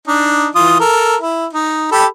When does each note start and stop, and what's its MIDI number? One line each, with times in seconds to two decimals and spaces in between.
0.07 0.48 62
0.07 0.48 63
0.55 0.80 52
0.55 0.80 65
0.55 0.80 87
0.80 1.16 69
0.80 1.16 70
1.21 1.46 64
1.53 1.90 63
1.92 2.06 67
1.92 2.06 69
1.92 2.06 83